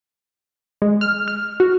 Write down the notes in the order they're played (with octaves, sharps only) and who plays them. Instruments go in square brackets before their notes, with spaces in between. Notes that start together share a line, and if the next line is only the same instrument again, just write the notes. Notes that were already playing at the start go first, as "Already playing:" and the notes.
[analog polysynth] G#3
F6
F6
F#4